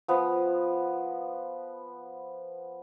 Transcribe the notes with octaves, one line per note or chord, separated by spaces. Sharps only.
F3 B3